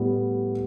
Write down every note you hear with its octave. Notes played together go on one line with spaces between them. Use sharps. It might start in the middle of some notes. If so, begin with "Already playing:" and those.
Already playing: A2 G3 B3